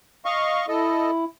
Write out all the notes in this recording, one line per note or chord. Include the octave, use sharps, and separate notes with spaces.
D#5 F5 C#6
E4 A4 D#5